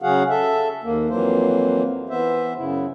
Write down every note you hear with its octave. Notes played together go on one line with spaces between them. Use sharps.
C#3 F#3 F#4 G#4 F5 F#5
A4 E5
D#2 A#3
F2 E3 F#3 A#3 C5
E3 B3 C5 E5
F#2 C#3 E4